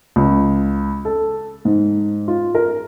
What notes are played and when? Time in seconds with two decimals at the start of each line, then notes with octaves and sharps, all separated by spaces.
0.16 C#2
1.05 A4
1.65 G#2
2.28 F4
2.55 A#4